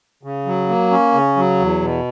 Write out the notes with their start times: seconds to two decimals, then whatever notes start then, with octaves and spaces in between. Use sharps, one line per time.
0.23 C#3
0.46 F#3
0.69 A#3
0.91 C#4
1.13 C#3
1.36 F#3
1.59 E2
1.82 B2